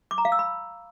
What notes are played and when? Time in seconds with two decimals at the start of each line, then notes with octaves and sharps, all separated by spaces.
0.11 D6
0.18 A#5
0.25 F5
0.32 E6
0.39 B5